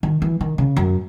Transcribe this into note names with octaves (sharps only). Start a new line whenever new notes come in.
D#3
E3
D#3
C#3
F#2